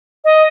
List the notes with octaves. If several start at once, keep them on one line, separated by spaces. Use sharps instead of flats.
D#5